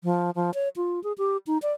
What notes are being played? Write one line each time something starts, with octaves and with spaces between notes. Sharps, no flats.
F3
F3
C#5
F4
G#4
G4
D#4
D5